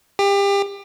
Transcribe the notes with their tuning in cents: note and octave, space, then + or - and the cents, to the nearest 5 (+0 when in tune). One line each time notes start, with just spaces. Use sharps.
G4 +30